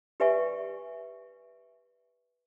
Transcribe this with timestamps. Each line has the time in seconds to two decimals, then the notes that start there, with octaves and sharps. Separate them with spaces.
0.20 G4 B4 D5 E5 G#5 C#6